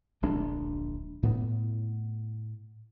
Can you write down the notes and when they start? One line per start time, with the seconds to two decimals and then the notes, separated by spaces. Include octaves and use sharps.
0.22 D1 A#1 G#3 D4
1.23 A2 B3